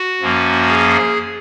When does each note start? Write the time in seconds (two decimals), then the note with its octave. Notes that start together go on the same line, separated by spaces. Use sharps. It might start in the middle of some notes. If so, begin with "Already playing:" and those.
Already playing: F#4
0.21 F#2 F3 A#3 C#4
0.69 G#4